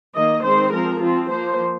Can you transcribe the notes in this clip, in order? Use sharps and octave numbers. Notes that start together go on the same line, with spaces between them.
D#3 A#3 D#5
D#3 G#3 C4 C5
F3 C4 A#4
F3 C4 F4
F3 A#3 C5